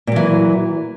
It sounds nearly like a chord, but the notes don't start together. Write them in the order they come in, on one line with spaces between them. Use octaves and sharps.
A#2 F#3 E3